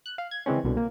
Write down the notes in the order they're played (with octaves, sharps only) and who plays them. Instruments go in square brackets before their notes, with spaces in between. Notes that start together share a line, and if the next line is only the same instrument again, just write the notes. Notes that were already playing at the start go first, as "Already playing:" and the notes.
[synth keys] F#6
F5
G#6
C#3 E3 G#3 C4 C#4
C2 B2 D3
A#3